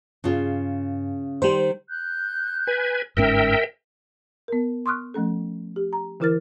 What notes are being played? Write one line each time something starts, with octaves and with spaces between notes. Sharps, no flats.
G2 C#3 F4
D#3 G3 C5
F#6 G6
B4 G#5
G1 G#2 C#4 A#4 E5 G5 E6
B3 A#4
C6 C#6 D#6 F6 F#6
F3 A3 C#4 A4
G4
A#5
D3 E3 E4 A#4 F6 A6